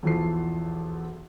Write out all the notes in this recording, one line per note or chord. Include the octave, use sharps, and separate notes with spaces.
B1 E2 E3 F3 A4 C7